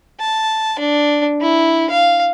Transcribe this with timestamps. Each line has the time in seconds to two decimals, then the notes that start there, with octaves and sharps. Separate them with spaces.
0.20 A5
0.79 D4
1.41 E4
1.90 F5